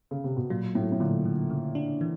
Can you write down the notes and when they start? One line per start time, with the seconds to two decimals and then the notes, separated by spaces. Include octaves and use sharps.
0.11 C#3
0.24 C3
0.37 B2
0.50 A#2 F#3
0.75 A2 F#3
0.92 A2
1.00 A#2 D3
1.25 D3
1.50 C#3
1.75 D4
2.01 E3